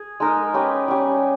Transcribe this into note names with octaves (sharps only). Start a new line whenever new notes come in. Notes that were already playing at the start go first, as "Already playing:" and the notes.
Already playing: G#4
G#3 D#4 A#4 D#5
C#4 G4 B4 D#5
G3 C#4 G4